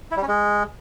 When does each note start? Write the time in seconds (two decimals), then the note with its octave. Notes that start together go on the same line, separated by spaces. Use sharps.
0.11 E4
0.17 G3
0.22 C#4
0.28 G#3